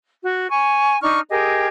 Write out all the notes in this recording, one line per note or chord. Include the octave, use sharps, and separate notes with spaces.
F#4
G#5 C#6
D4 D#4 C#6 F6
G4 G#4 A#4 D#5